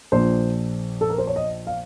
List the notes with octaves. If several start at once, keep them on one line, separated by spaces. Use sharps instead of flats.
A#1 A#2 F3 C5
A4
A#4
C5
C#5
D#5
F5